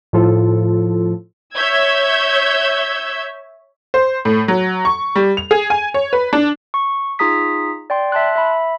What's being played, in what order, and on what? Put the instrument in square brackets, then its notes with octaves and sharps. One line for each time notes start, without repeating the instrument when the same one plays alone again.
[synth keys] A2 F3 F4 A4
[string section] C#5 E5 E6 G6 G#6
[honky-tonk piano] C5
A2
F#3
C#6
G3
F7
G#4
G#5
C#5
B4
D4
[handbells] C#6
D#4 F4 G#4 A#5 D#6 B6
D5 G5 C6
E5 A5 C6 F#6
E5 B5